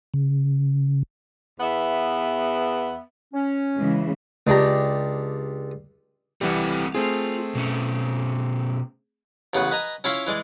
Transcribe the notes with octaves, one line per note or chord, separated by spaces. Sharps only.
C#3
E2 B3 E5
C#4
C#3 E3 G#3
C#2 D4 G4 A#5
C2 E3 G3 A3 C4 F#5
A3 C4 F4 G#4
B2 C#4
A1 C#3 B3 B4
B4 D#5 G#5 A#5
C#4 E4 F4 F5 B5
E3 G#3 D5